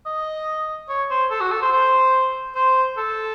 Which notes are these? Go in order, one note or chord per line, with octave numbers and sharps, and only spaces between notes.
D#5
C#5
C5
A4
F#4
A4
C5
C5
C5
A4